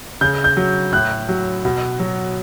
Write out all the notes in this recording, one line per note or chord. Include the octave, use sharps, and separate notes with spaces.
C#3 G6
G6
F#3
A2 F#6
F#3
B2
F#3